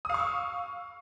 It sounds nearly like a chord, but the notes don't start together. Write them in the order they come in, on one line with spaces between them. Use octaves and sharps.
D#6 F5 C#6 E6